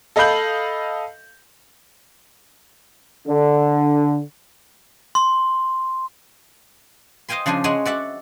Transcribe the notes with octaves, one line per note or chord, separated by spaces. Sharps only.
A4 D#5 F5 B5 G6 F#7
D3
C6
C5 D#5 F5 G5 G#5 C6
C#3 F3 D4 C5 G#5
G#3 C#5 F#5 G#5 C6
F#4 D5 E5 F#5